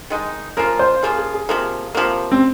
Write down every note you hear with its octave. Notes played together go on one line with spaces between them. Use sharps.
D#3 G#3 D#4
C#3 F3 A#3 F4 A#4
C5
C#3 F3 A#3 F4 G#4
G#4
G#4
C3 F3 A#3 G#4
C3 F3 A#3
C4